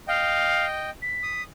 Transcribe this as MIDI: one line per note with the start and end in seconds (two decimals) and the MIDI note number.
0.08 0.90 75
0.08 0.65 77
0.08 0.90 79
1.02 1.42 95
1.23 1.44 87